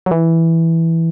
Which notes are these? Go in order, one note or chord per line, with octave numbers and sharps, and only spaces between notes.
F#3
E3